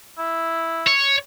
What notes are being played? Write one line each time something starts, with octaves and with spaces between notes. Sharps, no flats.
E4
C#5